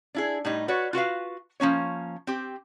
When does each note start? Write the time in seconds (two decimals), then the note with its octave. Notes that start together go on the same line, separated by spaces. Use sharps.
0.15 D4 E4 G#4
0.45 A2 G3 D#4
0.68 F#4 B4 C#5 D5
0.93 F4 F#4 B4 F5
1.60 F3 A#3 C#4 C#5
2.27 C4 G4